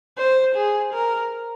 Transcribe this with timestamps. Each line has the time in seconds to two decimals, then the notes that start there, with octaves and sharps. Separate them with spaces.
0.18 C5
0.56 G#4
0.93 A#4